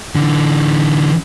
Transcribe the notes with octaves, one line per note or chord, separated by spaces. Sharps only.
D3 E3